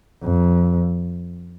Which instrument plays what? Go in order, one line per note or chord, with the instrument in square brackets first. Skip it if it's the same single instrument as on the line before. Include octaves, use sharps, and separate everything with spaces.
[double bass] F2